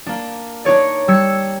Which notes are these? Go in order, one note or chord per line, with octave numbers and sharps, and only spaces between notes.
A#3 D4
D4 D#4 C#5 D5
G3 E6 G#6 C#7